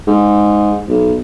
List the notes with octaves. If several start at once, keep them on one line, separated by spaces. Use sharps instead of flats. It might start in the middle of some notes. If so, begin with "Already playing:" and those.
G#2
B1